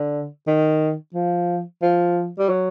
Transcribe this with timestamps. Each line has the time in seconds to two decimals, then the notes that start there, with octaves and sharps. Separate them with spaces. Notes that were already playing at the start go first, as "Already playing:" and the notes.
Already playing: D3
0.47 D#3
1.14 F3
1.83 F3
2.39 G3
2.49 F#3